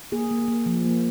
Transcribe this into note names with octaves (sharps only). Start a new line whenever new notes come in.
A#3 G#4
A#3
A#3
F3
A#3